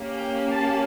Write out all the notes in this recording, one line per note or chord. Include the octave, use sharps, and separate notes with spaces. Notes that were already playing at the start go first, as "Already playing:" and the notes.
Already playing: A#3 C#4 G4
G5
A5